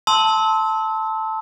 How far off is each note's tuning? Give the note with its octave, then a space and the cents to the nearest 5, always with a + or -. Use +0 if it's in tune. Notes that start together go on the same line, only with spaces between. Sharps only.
A5 +0 C6 +0 E6 -30